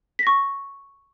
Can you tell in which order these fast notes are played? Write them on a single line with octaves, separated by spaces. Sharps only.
B6 A#6 C#6